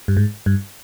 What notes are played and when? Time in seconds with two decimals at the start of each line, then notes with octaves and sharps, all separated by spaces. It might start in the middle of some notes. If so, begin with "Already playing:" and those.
0.08 G2
0.17 G#2
0.46 G2